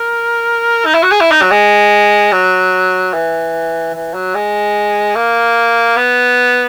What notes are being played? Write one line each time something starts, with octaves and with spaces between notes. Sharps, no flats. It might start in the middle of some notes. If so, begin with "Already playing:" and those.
Already playing: A#4
D#4
E4
F#4
G#4
E4
D#4
F#3
G#3
F#3
E3
E3
F#3
G#3
A#3
B3